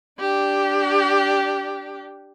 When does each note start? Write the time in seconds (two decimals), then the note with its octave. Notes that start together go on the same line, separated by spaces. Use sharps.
0.20 D4 G4